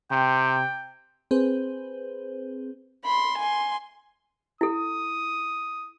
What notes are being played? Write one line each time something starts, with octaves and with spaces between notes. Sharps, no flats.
C3 G5
C4 G#4 B4 C5
B5 C6
G#5 C6
E4 A4 D#6